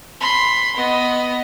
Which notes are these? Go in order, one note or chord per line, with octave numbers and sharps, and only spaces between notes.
B5 C6
B3 D#5